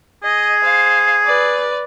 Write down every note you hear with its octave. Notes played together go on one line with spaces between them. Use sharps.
G#4 D#5
C5 F5
B4 D5